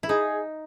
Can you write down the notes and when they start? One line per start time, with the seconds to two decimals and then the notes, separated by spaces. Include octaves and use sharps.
0.03 E4
0.08 D#4 G#4